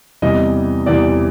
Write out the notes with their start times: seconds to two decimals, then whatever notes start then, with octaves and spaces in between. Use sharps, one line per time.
0.22 E2 C3 E3 G3 D#5
0.86 E2 C3 E3 G3 D5